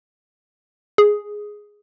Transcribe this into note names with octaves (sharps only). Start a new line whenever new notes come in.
G#4